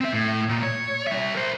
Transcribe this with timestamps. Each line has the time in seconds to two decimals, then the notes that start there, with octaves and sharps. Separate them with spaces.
0.01 C4 E5
0.14 A2
0.49 A#2
0.63 C#5
1.07 G3 E5
1.34 A#4 C5